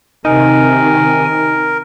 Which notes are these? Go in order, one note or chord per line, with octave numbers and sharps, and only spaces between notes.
C3 D#3 D#4 A#4 G#5